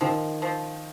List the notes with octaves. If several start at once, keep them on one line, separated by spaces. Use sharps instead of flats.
D#3 F3
F3